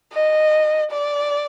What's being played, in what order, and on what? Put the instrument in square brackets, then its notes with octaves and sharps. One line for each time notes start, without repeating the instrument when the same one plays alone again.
[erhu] D#5
D5